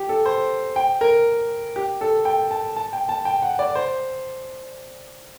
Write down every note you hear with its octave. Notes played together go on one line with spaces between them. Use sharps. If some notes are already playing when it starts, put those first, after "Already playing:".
Already playing: G4
A4
C5
G5
A#4
G4
A4
G5
A5
A5
G5
A5
G5
F#5
D5
C5